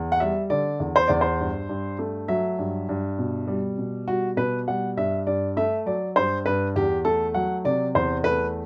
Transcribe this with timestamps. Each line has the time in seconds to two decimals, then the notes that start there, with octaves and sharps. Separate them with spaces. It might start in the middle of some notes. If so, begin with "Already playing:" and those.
Already playing: E2
0.12 F#5
0.20 G3 E5
0.50 D3 D5
0.80 E2
0.96 C5
1.08 E2 D5
1.21 C5
1.40 G2
1.69 G2
1.99 A3
2.28 F#3 E5
2.59 G2
2.89 G2
3.19 B2
3.47 G3
3.78 B2
4.08 G3 F#4
4.37 B2 B4
4.68 G3 F#5
4.97 G2 E5
5.27 G2 D5
5.57 A3 E5
5.86 F#3 D5
6.16 G2 C5
6.46 G2 B4
6.76 E2 G4
7.05 A3 A4
7.34 F#3 F#5
7.65 C3 D5
7.95 E2 C5
8.24 A3 B4